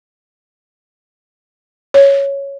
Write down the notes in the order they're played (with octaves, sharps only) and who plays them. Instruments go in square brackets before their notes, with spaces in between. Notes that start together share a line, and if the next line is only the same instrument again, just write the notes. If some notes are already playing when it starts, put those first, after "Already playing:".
[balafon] C#5